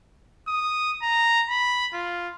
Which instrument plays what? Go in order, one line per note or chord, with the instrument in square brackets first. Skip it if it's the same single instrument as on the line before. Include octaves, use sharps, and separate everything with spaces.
[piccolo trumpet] D#6
A#5
B5
F4